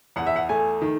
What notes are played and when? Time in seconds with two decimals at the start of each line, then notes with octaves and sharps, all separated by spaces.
0.16 E2 F#5
0.26 E5
0.36 F#5
0.49 A3 G#5
0.82 D#3